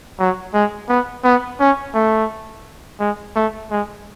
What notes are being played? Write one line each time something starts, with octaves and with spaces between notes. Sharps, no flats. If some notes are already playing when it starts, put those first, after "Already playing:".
F#3
G#3
B3
B3
C#4
A3
G#3
A3
G#3